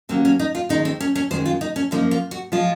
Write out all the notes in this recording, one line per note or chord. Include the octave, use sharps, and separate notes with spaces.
D#2 C#3 F#3 A#3 C4
C#4
D#4
F4
D#2 D#3 G#3 D#4
C4
C#4
C#4
F#2 D#3 G#3 C5
F4
D#4
C#4
F#2 F3 A#3 D#4
F4
F#4
F3 G#3 F4